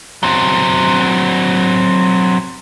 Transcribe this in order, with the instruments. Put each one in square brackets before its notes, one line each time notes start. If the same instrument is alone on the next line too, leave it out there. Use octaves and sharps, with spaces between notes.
[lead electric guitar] F#3 C4